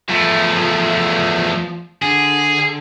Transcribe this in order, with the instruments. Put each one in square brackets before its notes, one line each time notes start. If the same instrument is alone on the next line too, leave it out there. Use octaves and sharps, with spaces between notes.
[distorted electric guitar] E2 A3 [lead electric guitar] F3
[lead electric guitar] D3 [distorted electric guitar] G#4